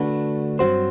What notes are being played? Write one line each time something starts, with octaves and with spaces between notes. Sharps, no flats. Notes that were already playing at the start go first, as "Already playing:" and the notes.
Already playing: D3 A3 D4 F#4 B4
G2 F#3 C4 F#4 C5